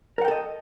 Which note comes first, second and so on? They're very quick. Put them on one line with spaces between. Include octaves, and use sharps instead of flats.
A#4 F#5 G5 A4 D#5